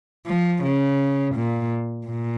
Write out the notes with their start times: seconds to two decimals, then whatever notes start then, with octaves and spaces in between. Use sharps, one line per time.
0.27 F3
0.62 C#3
1.35 A#2
2.06 A#2